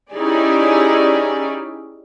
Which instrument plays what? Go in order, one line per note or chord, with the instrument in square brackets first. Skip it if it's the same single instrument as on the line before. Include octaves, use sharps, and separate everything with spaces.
[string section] C#4 D#4 E4 G4 G#4 D5